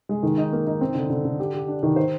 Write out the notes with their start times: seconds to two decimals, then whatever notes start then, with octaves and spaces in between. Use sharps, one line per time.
0.09 G#3
0.23 D#3
0.38 D#4
0.53 A#3
0.67 D#4
0.81 C4
0.95 D3
1.10 D3
1.25 D3
1.40 G4
1.54 G4
1.68 D4
1.83 D#3
1.96 C5